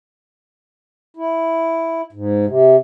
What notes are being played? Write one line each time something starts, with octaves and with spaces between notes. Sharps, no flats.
E4
G#2
C3